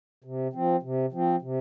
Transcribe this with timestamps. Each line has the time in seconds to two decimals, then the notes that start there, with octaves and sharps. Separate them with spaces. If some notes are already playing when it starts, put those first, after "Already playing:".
0.24 C3
0.53 F3 C4
0.82 C3
1.12 F3 C4
1.42 C3